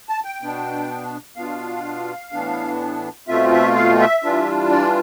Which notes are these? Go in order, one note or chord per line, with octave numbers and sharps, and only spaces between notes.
A5
G5
B2 B3 D4
B2 B3 D4 F4 F5
A2 E3 B3 D4
B2 A3 C4 F4 E5
E5
F5
E5
E3 G3 D4 F4
D5